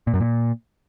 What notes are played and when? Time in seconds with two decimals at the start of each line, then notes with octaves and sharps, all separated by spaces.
0.07 A#2
0.14 F#2
0.20 A#2